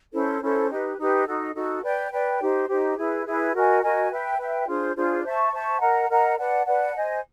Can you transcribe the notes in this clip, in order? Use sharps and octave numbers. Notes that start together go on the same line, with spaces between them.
C#4 E4 A4 C5
C#4 E4 A4 C5
D#4 G4 B4
D#4 G4 B4
D#4 F#4 A4
D#4 F#4 A4
B4 D5 G5
B4 D5 G5
D#4 G4 C5
D#4 G4 C5
E4 G#4 B4
E4 G#4 B4
F#4 A#4 D#5 G#5
F#4 A#4 D#5 G#5
B4 E5 G5
B4 E5 G5
D4 F4 G#4 C5
D4 F4 G#4 C5
C5 E5 A5 C#6
C5 E5 A5 C#6
A#4 D#5 F#5 A#5
A#4 D#5 F#5 A#5
B4 D5 F#5 A5
B4 D5 F#5 A5
C5 D#5 G#5